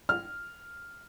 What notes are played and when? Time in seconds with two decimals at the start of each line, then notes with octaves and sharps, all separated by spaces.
0.09 F6